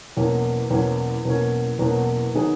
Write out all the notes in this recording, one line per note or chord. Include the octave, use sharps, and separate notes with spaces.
E2 B2 F#3 A#3 C#4
E2 B2 F#3 A#3 C#4
E2 B2 F#3 A#3 C#4
E2 B2 F#3 A#3 C#4
D#3 F#3 B3 D#4 G#4